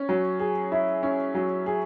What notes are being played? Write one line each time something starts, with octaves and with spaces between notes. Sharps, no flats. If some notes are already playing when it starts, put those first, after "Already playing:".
Already playing: C#4
F#3
G#4
E4
C#4
F#3
G#4